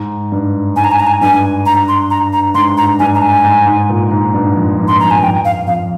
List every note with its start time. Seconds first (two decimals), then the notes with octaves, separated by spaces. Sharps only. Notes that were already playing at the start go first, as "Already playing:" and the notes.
Already playing: G#2
0.32 G2
0.76 G#2 G#5
0.84 A#5
0.92 G#5
1.00 A#5
1.07 G#5
1.21 G2 G#5
1.66 A#5
1.88 C6
2.10 A#5
2.33 A#5
2.54 G#2 C6
2.78 A#5
2.99 G2 G#5
3.15 A#5
3.22 G#5
3.44 G#2
3.66 G#2
3.90 A#2
4.11 G#2
4.34 G2
4.56 F2
4.79 G2
4.88 C6
5.00 F2 A#5
5.11 G#5
5.16 G2
5.23 F2 G5
5.45 F5
5.67 F2 F5